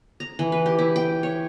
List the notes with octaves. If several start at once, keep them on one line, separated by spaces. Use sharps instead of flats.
A#5
E3
B4
G4
E4
G5
C#5